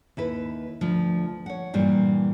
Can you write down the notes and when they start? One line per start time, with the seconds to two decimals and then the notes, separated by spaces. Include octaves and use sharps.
0.17 D#2 E4 B4
0.81 D2 F3
1.46 C#5 F#5
1.74 G2 A#2 E3 G3